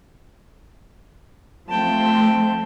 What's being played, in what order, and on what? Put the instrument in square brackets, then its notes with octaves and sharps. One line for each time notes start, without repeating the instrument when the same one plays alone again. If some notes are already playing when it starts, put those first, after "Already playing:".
[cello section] F3 A3 C4 [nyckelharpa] G5 A5